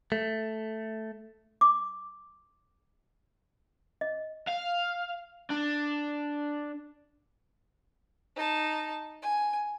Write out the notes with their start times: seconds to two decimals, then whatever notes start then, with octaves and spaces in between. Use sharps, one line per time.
0.12 A3
1.61 D6
4.01 D#5
4.48 F5
5.50 D4
8.36 D#4 A5
9.22 G#5